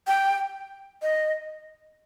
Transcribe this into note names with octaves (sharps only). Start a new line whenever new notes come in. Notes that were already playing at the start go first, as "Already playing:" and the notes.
G5
D#5